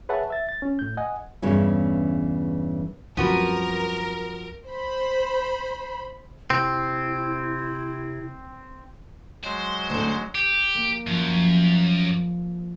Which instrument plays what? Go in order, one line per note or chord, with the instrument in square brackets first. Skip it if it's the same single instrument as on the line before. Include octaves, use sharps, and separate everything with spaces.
[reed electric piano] G#4 B4 C#5 E5 F#5 A5
E5 A6
A6
C#4
A2 G6
D#5 F#5 G#5
[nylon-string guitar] E2 G2 C#3 E3 C#4
[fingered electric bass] C2 F#2 C3 [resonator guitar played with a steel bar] F3 F#4 B4 [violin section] A#4
[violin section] C5 B5
[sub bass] C3 [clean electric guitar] C4 [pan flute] E4
[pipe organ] F#3 G#3 [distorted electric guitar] C5
[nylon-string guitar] D2 D3
[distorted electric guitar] G4
[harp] A#3
[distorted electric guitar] F#2 [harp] F3